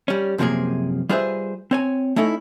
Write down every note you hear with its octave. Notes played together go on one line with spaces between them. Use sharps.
G3 C#4
F#2 C3 F3 G3 A#3 G#4
G3 F4 G#4 B4 C5 E5
C4 C#5 G#5
A3 C#4 D#4 E4 A4